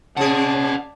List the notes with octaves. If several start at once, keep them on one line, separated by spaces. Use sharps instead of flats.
C3 C#4 G#4 D5 D#5 F#5 A5